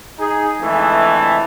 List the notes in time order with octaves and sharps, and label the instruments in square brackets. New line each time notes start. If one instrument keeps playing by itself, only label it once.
[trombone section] D#4 G#4
F2 D3 E3 G#3 A3